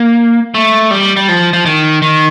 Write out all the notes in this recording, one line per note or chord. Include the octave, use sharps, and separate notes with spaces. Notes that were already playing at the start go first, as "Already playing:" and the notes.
Already playing: A#3
A3
G3
G3
F3
F3
D#3
D#3